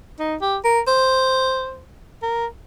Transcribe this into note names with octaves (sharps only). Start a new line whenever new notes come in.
D#4
G4
A#4
C5
A#4